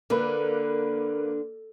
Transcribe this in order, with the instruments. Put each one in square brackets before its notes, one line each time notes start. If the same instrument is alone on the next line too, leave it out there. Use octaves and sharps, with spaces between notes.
[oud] D3 [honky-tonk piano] A#3 B4